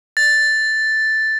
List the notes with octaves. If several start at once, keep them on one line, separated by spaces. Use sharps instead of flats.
A6